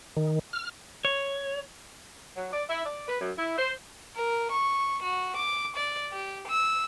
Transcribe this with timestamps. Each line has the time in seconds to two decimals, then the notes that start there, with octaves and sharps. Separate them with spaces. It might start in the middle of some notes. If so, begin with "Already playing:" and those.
0.17 D#3
0.53 F6
1.05 C#5
2.36 F#3
2.53 D5
2.69 E4
2.86 D5
3.08 B4
3.21 F#2
3.37 E4
3.58 C5
4.16 A#4
4.51 C#6
5.03 F#4
5.37 D6
5.76 D5
6.11 G4
6.47 E6